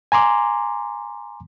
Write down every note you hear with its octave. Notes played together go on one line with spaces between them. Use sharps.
G#5 A#5 C6 D6